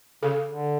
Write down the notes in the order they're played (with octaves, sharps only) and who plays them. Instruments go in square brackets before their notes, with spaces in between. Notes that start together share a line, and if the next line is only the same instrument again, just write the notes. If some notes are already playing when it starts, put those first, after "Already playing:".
[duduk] C#3 [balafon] A4
[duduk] D3